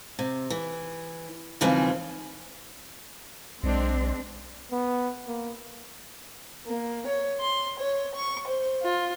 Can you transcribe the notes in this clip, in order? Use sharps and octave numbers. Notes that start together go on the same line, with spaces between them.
C3
E3
D#2 C#3 E3 F3 G3 C4
B1 G#3 C4 D4
B3
A#3
A#3
C#5
C6
C#5
C#6
C5
F4